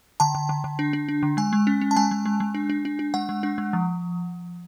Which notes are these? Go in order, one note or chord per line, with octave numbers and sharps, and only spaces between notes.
D3 A5
D3
D3
D3
D4
D4
D4
D3
G#3 G#5
G#3
C#4
C#4
A5
G#3 G#5
G#3
G#3
G#3
D4
D4
D4
D4
G#3 F#5
G#3
D4
G#3
F3